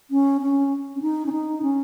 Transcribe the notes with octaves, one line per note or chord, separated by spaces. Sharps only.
C#4
C#4
C#4
D#4
C#4
D#4
C#4